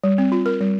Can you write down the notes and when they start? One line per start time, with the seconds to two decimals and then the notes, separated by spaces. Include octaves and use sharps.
0.04 G3
0.18 C4
0.32 F4
0.46 A#4
0.61 G3